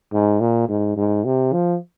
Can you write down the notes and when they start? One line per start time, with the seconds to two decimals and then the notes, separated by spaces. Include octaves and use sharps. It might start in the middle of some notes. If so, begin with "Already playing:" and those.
0.13 G#2
0.41 A#2
0.69 G#2
0.96 G#2
1.25 C3
1.53 F3